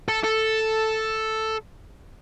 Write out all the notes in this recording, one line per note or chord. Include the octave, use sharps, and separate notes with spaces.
A4
A4